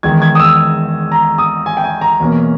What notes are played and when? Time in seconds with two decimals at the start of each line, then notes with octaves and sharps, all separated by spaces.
0.03 E2 D#3 G#3 G#6
0.22 G#6
0.35 D#6
0.39 E6
1.12 A#5
1.38 D#6
1.66 G#5
1.77 G5
1.84 G#5
2.01 A#5
2.20 E2 B2 A#3 C#4